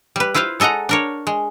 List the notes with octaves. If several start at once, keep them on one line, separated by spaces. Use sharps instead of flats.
G3 B4
E4 F4 B4 C5 F5
G#3 A4 D#5 F#5 A#5
D4 A#4 C#5
G#3